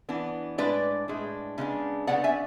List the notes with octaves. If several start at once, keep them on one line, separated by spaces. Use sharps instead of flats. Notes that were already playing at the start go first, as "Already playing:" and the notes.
E3 B3 D4
A2 G#3 D4 B4 D5
A2 G#3 D4
C#3 G#3 B3 D4
C#3 G#3 B3 D4 D5 F#5
E5 G#5